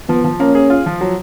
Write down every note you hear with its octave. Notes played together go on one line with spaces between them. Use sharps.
F3 B3
F3
A#3 C#4
G#4
F4
F3
F#3